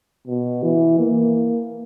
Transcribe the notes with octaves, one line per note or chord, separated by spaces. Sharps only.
B2
E3
A#3